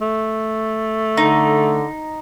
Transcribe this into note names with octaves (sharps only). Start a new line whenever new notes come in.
A3
D3 D#4